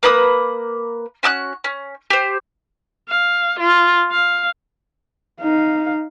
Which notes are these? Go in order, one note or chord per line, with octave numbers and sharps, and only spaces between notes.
A#3 B4 B5 D#6
C#4 F#4 D#6 F#6
C#4
G4 C5
F5
F4
F5
D#4 F5